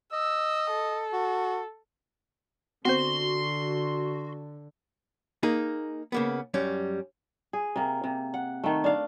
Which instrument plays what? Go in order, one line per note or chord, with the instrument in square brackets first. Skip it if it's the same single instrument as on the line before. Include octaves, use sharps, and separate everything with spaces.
[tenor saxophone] D#5 [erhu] E6
[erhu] A4
[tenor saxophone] F#4
[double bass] D3 [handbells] B3 C4 C5 [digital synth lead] F#4 [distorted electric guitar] C6
[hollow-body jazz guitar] A#3 D#4 G#4
C#3 A#3 B3
F#2 G3 C#4
[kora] G#4
C3 A#3
C3
F#5
D#3 A3
D4 F5